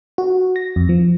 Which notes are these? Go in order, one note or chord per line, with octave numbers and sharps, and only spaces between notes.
F#4
A#6
F2
F3